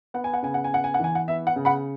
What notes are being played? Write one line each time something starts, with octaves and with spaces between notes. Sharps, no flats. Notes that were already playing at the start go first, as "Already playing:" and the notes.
B3 F#5
G#5
F#5
C#3 G#5
F#5
G#5
B3 F#5
G#5
F#5
E3 G#5
F#5
B3 E5
F#5
C#3
F#5 B5